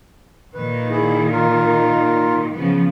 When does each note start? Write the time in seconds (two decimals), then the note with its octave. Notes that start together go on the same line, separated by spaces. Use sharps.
0.54 A#2 D#3 B4
0.90 E4 G#4
1.32 F4 A#4
2.53 C#3 F3 B3